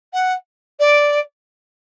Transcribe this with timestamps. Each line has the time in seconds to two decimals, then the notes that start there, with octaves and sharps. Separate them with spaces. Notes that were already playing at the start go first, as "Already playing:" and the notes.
0.13 F#5
0.79 D5